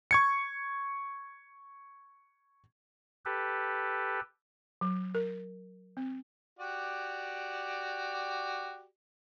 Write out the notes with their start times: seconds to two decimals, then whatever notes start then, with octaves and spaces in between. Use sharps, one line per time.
0.11 C#6 G#6 C#7
3.25 G4 A4 B4
4.81 F#3
5.15 A#4
5.97 C4
6.59 F#4 G4 D5